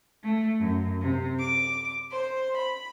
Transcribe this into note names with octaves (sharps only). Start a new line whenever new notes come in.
A3
F#2
C3
D6
C5
B5